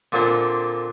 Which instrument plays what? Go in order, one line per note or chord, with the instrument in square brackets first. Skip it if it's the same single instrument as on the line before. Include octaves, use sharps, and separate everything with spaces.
[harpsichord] A#2 D3 A#3 C4 D4